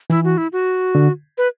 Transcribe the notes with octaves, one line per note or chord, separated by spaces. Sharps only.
E3 E4
F#4
E4
F#4
D3
B4